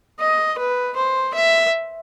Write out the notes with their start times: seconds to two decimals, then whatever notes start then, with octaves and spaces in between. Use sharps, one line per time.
0.20 D#5
0.58 B4
0.96 C5
1.34 E5